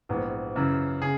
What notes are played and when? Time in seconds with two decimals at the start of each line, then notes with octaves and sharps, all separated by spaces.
0.09 A#1 G#2 E3 B3
0.56 F#2 C#3 E3
1.02 C#3 G#4